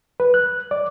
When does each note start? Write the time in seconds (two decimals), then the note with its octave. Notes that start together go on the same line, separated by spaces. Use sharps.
0.20 B4
0.34 F#6
0.71 D5